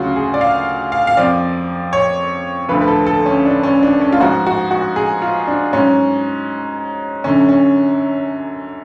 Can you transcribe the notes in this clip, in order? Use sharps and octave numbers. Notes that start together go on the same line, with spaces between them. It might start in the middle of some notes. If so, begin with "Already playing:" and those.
Already playing: D2 C#3 F#3 F4 F#4
G#4
D5
F5
F5
F5
F2 F3 D5
C#5
D2 D3 F3 B4
B4
A4
A4
C#4
D4
C#4
D4
C#4
F4
G#2 F3 F#4
F#4
F#4
G#4
F4
D4
G#2 F#3 C#4
F#2 D3 F#3 C#4
C#4